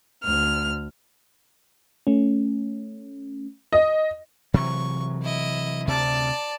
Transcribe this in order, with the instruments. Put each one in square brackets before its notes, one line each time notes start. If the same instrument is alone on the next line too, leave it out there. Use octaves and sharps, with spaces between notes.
[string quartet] D2 F6
[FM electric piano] A3 C#4
[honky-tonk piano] D#5
[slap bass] C3 E3 F#3 [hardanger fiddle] C#6
[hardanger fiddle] E4 D#5
[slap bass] D2 C3 [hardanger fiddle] D5 A5